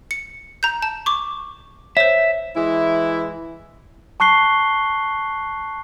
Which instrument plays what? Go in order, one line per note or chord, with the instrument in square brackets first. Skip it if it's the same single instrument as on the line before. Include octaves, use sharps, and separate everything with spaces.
[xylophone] C#7
A#5 G6
A5
C#6 D6
[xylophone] C5 C#5 [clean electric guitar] E5
[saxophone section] E3 G#3 E4
[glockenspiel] A5 C#6 F#6 C7 G7